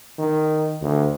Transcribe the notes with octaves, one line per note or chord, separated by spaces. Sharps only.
D#3
D2